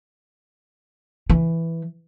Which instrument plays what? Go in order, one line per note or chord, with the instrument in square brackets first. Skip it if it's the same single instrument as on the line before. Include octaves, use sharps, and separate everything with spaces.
[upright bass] E3